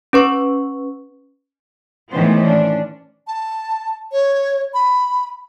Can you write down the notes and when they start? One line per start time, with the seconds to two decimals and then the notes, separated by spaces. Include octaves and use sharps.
0.13 C#4 B4 C#6
2.12 A2 D#3 E3 G#3 B3 C5
2.43 C#4 D4
3.28 A5
4.12 C#5
4.74 B5